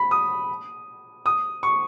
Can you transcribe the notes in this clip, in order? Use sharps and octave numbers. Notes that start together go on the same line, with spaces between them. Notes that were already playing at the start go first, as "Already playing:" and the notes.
Already playing: B5
D#6
D#6
C#6